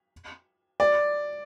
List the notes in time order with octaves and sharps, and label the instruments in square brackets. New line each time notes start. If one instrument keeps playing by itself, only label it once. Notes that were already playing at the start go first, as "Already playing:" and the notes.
[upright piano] D5